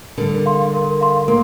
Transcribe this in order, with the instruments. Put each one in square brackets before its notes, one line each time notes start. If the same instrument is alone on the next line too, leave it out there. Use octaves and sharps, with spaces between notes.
[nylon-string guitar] D3 G3 [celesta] A#4
[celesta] F5 C6
A#4
F5 C6
[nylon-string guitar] A#3 [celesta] A#4